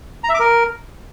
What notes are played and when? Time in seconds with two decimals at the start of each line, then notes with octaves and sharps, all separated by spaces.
0.24 A#5
0.29 E5
0.34 D6
0.40 A#4